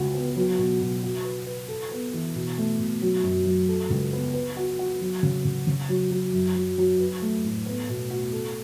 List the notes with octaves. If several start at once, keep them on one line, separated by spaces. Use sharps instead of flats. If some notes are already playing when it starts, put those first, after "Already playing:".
Already playing: C#2 F#4
B3
F#3
B2
B2
F#4
B4
B4
A4
B3
E3
B2
A3
B2
F#3
F#2
F#3
A4
C#2
B3
B4
F#4
F#4
F#3
C#3
C#3
C#3
F#3
F#3
F#2
F#3
F#3
B4
A3
A2
B3
B2
F#4
A4